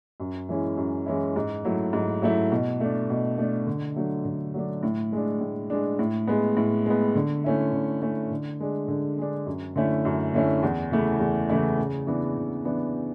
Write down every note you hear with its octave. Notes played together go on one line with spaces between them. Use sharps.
F#2
E3 G#3 C#4 E4
F#2
E3 G#3 C#4 E4
G#2
F#3 A3 E4
G#2
F#3 A3 E4
B2
A3 D4
B2
A3 D4
D3
F#3 A3 D4
D3
F#3 A3 D4
A2
G#3 D4
A2
G#3 D4
A2
G#3 B3
A2
G#3 B3
D3
A3 C#4 E4
D3
A3 C#4 E4
D3
G#3 D4
D3
G#3 D4
F#2
D3 A3 C#4 E4
F#2
D3 A3 C#4 E4
E2
C#3 E3 A3 E4
E2
C#3 E3 A3 E4
C#3
E3 B3 D4
C#3
E3 B3 D4